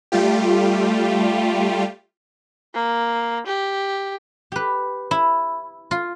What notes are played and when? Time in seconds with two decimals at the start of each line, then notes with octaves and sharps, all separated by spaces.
0.12 G3 A3 F4 G4
2.74 A#3
3.47 G4
4.52 G4 B4
5.11 E4
5.91 F4